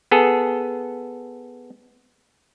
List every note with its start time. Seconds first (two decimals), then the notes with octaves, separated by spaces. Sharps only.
0.11 B3 G#4 A4